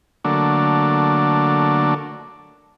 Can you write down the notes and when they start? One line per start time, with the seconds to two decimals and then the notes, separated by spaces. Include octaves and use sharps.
0.25 D3 F#3 A3 A#3 D4